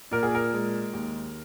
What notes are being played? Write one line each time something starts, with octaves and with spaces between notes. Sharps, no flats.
A#2 A#4
G#4
A#4
G#3
D#2